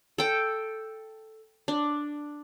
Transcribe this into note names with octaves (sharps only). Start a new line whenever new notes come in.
A4 G5
D4